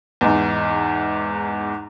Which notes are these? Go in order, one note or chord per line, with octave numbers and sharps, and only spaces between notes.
E2 G#2